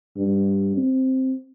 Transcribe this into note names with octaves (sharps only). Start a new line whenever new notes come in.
G2
C4